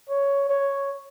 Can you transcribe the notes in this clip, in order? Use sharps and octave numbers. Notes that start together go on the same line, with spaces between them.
C#5
C#5